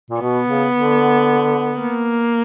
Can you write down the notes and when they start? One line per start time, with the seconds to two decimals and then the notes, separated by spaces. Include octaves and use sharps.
0.10 A#2
0.21 B2 B3
0.48 C#3
0.74 D3
1.79 A#3